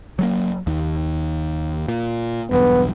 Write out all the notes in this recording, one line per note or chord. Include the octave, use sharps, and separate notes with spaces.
F#3 G3 A#3
D#2
A#2
B1 E2 G2 B3